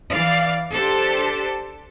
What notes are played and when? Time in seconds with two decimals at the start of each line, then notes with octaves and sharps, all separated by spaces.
0.11 E3 D5 F5
0.73 D4 G4 A4 C5